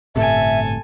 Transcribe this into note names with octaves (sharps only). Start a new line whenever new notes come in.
G1 A2 C3 A4 E5 G#5